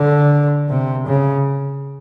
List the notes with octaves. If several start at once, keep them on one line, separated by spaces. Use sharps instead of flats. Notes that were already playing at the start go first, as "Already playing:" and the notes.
Already playing: D3
C3
C#3